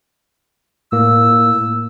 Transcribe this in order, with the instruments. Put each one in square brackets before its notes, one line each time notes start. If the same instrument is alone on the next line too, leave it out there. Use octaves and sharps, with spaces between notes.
[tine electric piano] A2 A#3 [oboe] E6